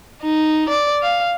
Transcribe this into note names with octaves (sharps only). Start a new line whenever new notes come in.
D#4
D5
F5